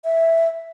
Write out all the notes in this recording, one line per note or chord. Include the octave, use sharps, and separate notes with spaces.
E5